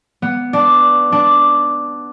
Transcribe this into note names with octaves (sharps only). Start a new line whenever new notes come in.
B3
D4
D4